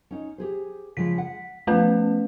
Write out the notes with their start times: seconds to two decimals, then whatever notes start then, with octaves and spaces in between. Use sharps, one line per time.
0.11 C#4 D#4
0.38 G4 G#4 C5
0.97 C#3 F3 G#3 B6
1.18 F#5
1.67 F3 A3 B3 C#4 B4